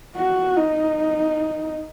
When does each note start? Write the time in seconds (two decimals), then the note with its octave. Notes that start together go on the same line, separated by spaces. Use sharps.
0.16 F#4
0.57 D#4